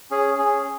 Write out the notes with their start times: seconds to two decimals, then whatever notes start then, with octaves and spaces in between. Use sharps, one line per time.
0.11 C#4 G#4
0.38 C#4 G#4